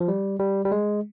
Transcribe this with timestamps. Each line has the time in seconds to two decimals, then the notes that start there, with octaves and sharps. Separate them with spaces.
0.01 F3
0.08 G3
0.39 G3
0.65 G3
0.72 G#3